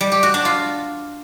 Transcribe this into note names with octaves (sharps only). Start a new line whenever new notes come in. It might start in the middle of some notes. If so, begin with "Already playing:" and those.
G3
G4
F#4
D4
F4